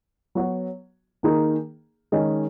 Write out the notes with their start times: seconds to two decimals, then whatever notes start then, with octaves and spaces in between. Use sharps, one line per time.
0.35 F#3 B3 F#4 C#5
1.23 D#3 A#3 D#4 G#4
2.12 D#3 G#3 C#4 G#4 D#5